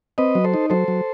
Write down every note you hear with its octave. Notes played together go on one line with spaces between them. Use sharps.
C4 B4 D#5
F#3
A4 C5
D#4
F#3 A4 C5
F#3